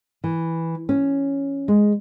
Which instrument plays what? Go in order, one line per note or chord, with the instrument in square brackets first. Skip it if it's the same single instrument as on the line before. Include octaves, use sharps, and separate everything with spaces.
[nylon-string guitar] E3
C#4
G#3